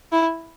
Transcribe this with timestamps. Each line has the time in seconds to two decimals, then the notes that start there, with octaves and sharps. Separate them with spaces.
0.12 E4